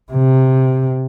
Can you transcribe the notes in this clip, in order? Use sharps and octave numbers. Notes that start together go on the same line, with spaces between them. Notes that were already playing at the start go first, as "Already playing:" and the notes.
C3